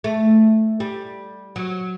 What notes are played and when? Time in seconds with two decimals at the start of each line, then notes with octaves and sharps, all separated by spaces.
0.04 A3
0.80 G3
1.56 F#3